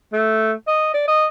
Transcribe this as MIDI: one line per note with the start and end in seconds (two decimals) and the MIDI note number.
0.13 0.52 57
0.68 0.93 75
0.94 1.03 74
1.08 1.26 75